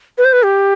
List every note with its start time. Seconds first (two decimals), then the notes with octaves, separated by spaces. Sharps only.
0.18 B4
0.25 C5
0.33 B4
0.44 G4